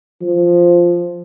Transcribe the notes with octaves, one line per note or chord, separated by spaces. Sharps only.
F3